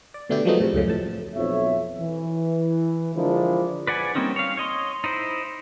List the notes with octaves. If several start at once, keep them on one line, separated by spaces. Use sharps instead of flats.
D5
B2 D3 A3 D4 E4 G4
F3 F#3 G#3 A3 B3 D#4
A2 C3
C#2 F#2 A2 C#3
F2 A2 A5
B1 F2 F3 C#5 E5
E3
D3 F3 G#3 D4 E4 A#4
B4 D5 F#5 G#5
G3 A#3 C4 C#4 D#4
C#5 F5
C#5 D#5 C6
D#4 E4 C5